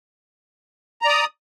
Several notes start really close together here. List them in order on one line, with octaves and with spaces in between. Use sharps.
A#5 D5 D#6